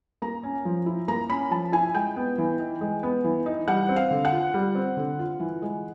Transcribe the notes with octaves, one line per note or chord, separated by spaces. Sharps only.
A#3 A#5
C#4
F3
E4
A#3 A#5
C#4 B5
F3 A5
E4 G#5
G#3 G5
B3
E3
D#4
G#3
B3
E3
D#4
G3 F#5
C4
F5
D3
F#5
F4
G3
C4
D3
F4
E3
G#3